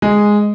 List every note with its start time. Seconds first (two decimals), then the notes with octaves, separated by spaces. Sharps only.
0.02 G#3